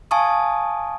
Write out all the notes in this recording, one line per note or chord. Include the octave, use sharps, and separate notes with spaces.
F5 G#5 A5 C#6 D#6